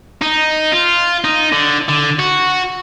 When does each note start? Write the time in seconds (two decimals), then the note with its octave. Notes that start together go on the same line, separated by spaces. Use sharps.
0.22 D#4
0.72 F4
1.24 D#4
1.52 D3
1.89 D3
2.19 F#4